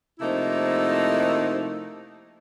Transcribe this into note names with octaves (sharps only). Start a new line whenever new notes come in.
C3 F3 A3 A#3 D#4 E4